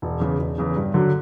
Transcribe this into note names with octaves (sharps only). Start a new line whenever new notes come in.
E1
E2 C#3
E1
E2 C#3
G2
D3 F#3